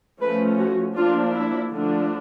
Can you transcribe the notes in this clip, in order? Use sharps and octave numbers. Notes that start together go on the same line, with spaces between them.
F3 A3 C#4 B4
F#4
F3 A#3 D4 F4
E4
D3 F3 A3 D4